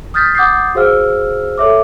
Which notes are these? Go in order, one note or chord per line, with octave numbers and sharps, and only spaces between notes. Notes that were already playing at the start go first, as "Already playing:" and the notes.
D#6 F6 G6 A6 B6
F#5 D6 D#6 G6 A6 C7
F#4 G#4 C5 F5 E6 F6
A4 C#5 E5 D6